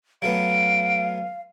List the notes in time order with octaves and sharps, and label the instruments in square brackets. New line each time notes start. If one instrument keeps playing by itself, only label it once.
[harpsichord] F#3 A3 B3 [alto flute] F5 [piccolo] D7